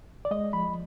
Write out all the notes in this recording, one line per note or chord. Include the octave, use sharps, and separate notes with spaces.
D5
G#3 D#5
F3 B5